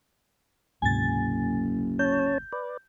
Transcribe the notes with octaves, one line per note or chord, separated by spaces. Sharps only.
F#1 D2 G#2 C3 G#5 A6
C#4 C#5 A5 G6
B4 D5